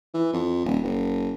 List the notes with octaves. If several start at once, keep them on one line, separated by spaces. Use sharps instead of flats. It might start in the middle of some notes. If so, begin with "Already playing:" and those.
E3
F2
D#1
F#1